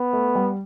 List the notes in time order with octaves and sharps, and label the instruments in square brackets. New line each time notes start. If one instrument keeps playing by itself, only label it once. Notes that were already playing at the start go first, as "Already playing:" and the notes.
Already playing: [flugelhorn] B3
[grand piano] A3
G3